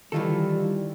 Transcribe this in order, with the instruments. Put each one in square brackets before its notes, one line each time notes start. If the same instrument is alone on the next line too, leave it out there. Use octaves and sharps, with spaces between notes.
[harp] D#3 [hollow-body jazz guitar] E3 F4 A4 [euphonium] G3